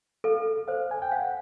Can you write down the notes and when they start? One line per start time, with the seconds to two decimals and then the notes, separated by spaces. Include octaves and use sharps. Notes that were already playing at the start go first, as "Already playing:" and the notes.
0.24 A4 F5
0.68 C5 F5
0.91 G#5
1.02 G5
1.12 F5 F#5